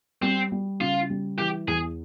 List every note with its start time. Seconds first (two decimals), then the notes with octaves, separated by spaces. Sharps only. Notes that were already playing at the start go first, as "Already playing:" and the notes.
0.22 G3 C4
0.52 G3
0.81 C#3 F4
1.10 G3
1.38 E3 G4
1.67 E2 G#4